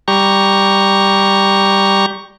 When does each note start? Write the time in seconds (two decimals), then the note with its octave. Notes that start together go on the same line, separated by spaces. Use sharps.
0.08 G3 G4 A#5 C#6